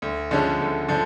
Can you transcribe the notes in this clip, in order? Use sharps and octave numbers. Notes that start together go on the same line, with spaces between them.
D2
D3 F3 G#3 C#4
D2
D3 F3